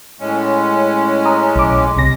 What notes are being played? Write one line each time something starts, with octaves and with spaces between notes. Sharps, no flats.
A2 G#3 C#4
A#5 D#6
B1 D6
C2 C3 A#6